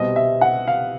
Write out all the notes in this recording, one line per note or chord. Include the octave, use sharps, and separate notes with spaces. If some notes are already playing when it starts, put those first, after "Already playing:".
Already playing: C2 B2 G3 C4 D#5
E5
F#5
F5